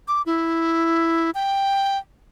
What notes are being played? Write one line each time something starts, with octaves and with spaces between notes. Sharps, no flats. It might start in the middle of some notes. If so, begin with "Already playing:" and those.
D6
E4
G5